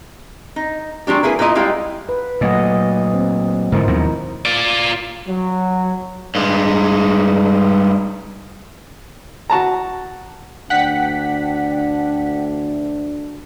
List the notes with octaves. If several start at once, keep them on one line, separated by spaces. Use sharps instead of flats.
D#4
F#3 G#3 D4 G4
A#3 E4 G#4 A4 B4
A#2 B3 E4 D#5 A#5
G3 G#3 E4 F5 G5
B4
A#2 F#3 A3 D#5 F#5
C4
G#2 D3 F3 E4 A#4 C5
D#2 B2 F3 F#3 C4 D#4
F4 D5
F#3
G2 G#3
F#4 A5 A#5
D2 D4 F#5 G5 B6